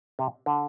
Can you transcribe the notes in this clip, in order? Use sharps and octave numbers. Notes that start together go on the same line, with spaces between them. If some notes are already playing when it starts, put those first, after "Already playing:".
C3
D3